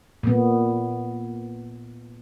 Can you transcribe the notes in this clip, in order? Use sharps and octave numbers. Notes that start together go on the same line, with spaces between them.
A#2 B3